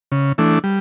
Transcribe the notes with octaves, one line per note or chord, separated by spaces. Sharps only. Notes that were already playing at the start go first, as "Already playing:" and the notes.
C#3
E3 A3 D4
G3